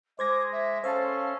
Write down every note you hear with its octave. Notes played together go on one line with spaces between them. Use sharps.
G#3 C5 D6 G#6 A#6
E5
C#4 A4 C5 F5 A5